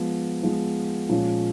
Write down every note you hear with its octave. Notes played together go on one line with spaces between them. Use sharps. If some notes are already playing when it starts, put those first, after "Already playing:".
Already playing: F3 G#3 B3
F3 G#3 B3
A#2 F3 G#3 C#4